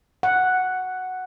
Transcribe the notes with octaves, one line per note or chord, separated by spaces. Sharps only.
F#5